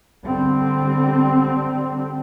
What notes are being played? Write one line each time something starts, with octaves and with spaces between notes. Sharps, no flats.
D3 G3 C4